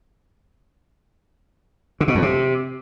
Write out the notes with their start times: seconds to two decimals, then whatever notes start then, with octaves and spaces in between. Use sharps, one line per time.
2.00 D3
2.08 B2
2.15 F2
2.22 C3